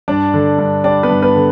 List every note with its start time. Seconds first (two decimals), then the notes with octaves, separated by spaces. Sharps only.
0.08 G2 D4 D5
0.34 D3
0.59 G2
0.84 G3 D4 D5
1.03 B3 B4
1.09 G2
1.22 B3 B4
1.35 D3